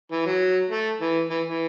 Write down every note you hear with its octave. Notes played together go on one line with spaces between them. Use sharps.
E3
F#3
A3
E3
E3
E3